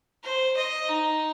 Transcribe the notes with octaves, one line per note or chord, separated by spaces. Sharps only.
C5
D#5
D#4